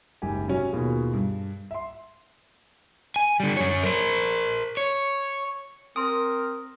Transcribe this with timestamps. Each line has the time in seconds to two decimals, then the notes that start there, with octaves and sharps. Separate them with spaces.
0.22 F#1 G#2 G4 G#5
0.47 C3 F#3 C#4 F#4
0.72 D#2 B2 F4 G#4
1.14 G2
1.71 E5 C6
3.16 G#5
3.40 D3 G3
3.57 F#2 C#5
3.83 A#4 C5
4.77 C#5
5.96 C4 A#4 G#5 C6 D#6